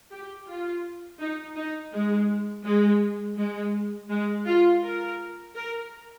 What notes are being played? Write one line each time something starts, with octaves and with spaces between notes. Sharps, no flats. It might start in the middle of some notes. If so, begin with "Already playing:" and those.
G4
F4
D#4
D#4
G#3
G#3
G#3
G#3
F4
A#4
A#4